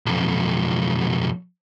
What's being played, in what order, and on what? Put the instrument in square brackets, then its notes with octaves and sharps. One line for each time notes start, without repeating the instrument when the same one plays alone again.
[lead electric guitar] B1 F2